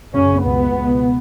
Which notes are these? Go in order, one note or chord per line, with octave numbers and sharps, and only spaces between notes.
F#2 C#3 C#4
C#2 B2 B3
C#2 B2